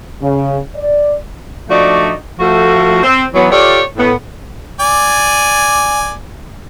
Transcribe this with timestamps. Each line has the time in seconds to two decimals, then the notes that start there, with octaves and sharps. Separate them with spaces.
0.21 C#3
0.75 D5
1.70 F3 A3 D4 D#4 F#4 D5
2.40 F3 A3 F#4
3.03 C4
3.34 E3 F#3 B3
3.52 F4 G4 A4 C#5 D5
3.97 A2 B3
4.80 D5 G#5